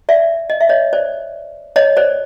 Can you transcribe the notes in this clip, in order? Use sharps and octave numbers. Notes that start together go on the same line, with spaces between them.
D5 E5
D#5
E5
C#5 D#5
C5 D5
C#5 D#5
C5 D5